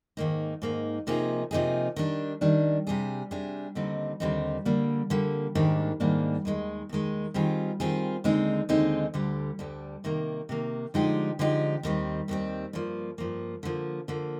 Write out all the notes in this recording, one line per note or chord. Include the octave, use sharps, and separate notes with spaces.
G#2 D#3 A#3 D#4
G#2 D#3 A#3 D#4
C3 F3 A#3 D#4 G#4
C3 F3 A#3 D#4 G#4
D#3 G3 D4
D#3 G3 D4
C3 G3 D4 G#4
C3 G3 D4 G#4
D#2 D3 G3 C4 D#4
D#2 D3 G3 C4 D#4
D3 G3 A#3
D3 G3 A#3
G#2 D#3 G3 A#3 D4
G#2 D#3 G3 A#3 D4
D#2 D#3 G#3
D#2 D#3 G#3
D#3 G3 C4 F4 G#4
D#3 G3 C4 F4 G#4
D#2 D3 G#3 C4 D#4
D#2 D3 G#3 C4 D#4
D2 D3 G3
D2 D3 G3
C3 D#3 A#3
C3 D#3 A#3
D3 F3 G#3 D#4 G4
D3 F3 G#3 D#4 G4
D#2 D#3 G3 C4
D#2 D#3 G3 C4
G2 F3 A#3
G2 F3 A#3
D3 F3 A#3
D3 F3 A#3